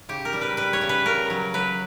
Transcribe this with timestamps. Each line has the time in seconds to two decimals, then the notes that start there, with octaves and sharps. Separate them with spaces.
0.09 C#3 G4
0.25 A#4
0.33 G3
0.41 B4
0.57 G3 B4
0.73 C#5
0.81 C#3
0.89 B4
1.05 C#3 A#4
1.30 F#3
1.54 F#3 B4